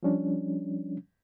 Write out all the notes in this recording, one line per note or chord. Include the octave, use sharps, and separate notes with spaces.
F3 G3 C#4 D4